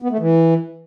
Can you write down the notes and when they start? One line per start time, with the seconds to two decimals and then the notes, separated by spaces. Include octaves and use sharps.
0.02 B3
0.11 A3
0.19 E3